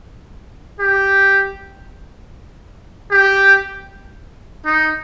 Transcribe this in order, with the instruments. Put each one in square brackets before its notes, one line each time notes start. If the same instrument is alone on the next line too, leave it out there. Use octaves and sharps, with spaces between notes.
[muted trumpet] G4
G4
D#4